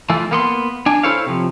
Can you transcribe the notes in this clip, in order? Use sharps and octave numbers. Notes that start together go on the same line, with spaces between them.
E3 A3 F4
A#3 B3 C6
D4 G#5
E4 A4 C5 C#5 F5
C3 F3